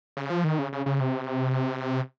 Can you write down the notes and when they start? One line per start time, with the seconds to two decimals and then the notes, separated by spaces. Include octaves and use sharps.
0.17 C#3
0.30 F3
0.44 D#3
0.59 C#3
0.72 C#3
0.86 C#3
1.00 C3